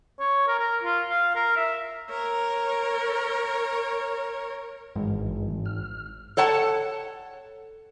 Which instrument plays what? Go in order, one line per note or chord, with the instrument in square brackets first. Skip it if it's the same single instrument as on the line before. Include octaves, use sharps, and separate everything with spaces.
[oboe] C#5
A#4
A#4
F4
F5
A#4
E5
[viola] A#4 C#5
[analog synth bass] G#1 [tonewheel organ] G2 E3 G#3
[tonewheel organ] F6
[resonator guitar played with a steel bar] A4 C#5 F#5 A5